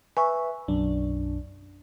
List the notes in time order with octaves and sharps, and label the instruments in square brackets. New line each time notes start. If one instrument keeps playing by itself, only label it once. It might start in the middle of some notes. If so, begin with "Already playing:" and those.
[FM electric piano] B4 E5 [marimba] G#5 C#6
[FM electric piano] B1 F#2 D4